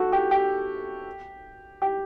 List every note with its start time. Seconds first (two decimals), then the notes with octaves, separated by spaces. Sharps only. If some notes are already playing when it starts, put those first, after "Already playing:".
Already playing: F#4 A4
0.12 G4
0.31 G4
1.82 G4